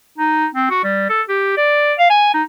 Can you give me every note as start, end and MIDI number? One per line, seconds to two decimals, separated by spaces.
0.18 0.47 63
0.54 0.68 60
0.70 0.83 66
0.84 1.08 55
1.10 1.22 69
1.29 1.56 67
1.57 1.93 74
1.98 2.07 77
2.10 2.31 80
2.34 2.43 63